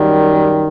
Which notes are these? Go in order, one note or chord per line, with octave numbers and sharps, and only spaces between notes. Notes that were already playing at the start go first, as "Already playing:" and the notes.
Already playing: F#2 D#3 G3